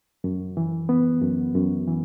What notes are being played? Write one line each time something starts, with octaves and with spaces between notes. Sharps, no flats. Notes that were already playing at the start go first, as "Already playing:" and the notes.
F#2
E3
B3
F#2
F#2
E3